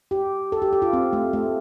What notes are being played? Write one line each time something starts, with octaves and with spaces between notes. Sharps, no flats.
G4
A4
G4
G4
F4
C4
A3
A3